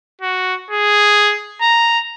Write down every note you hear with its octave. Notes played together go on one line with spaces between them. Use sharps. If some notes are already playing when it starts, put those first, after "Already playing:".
F#4
G#4
A#5